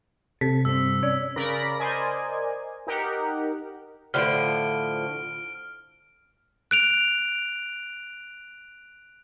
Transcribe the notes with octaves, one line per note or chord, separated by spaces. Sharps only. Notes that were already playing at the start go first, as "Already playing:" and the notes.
C3 A4 B6
G2 C4 E6
C#4 C#5 D5
C#3 A#4 D5 B5 A#6
A#4 C5 D5 D#5 G#5
D#4 G4 A#4 F#5
A2 D3 F3 F6 D7
F#6 D7 F7